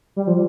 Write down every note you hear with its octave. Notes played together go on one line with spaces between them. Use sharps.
G3
F3